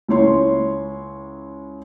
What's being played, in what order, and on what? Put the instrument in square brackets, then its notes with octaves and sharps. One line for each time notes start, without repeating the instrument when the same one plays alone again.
[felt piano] C#2 E4 C#5 C6